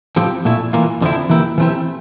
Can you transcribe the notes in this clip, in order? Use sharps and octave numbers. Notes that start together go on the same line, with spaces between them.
A2 F3 C4 G4
A#2 A3 E4
E3 A#3 F4
F2 D3 F3 C4 E4
E3 A#3 E4 G4
E3 A3 C4 E4 G4